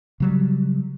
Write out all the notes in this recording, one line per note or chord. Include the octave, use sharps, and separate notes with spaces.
C#3 F#3 G3